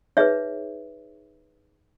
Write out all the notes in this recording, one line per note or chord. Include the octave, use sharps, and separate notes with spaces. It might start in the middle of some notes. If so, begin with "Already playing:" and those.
D#4 G#4 B4 C#5 E5